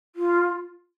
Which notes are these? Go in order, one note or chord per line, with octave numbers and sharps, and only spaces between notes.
F4